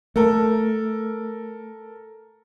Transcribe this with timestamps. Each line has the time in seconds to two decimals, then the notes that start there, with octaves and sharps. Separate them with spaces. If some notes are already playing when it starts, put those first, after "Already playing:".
0.16 A3 A4 A#4